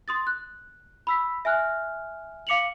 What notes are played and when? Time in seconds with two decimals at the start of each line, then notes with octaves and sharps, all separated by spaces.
0.08 C6 D#6 A6
0.27 F#6
1.07 B5 E6 B6
1.45 E5 G#5 F6 F#6
2.47 F5 D6 C#7 F7 F#7